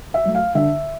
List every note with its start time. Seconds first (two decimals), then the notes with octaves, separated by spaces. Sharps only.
0.14 E5
0.25 F#3 A3
0.35 F5
0.55 D3 E5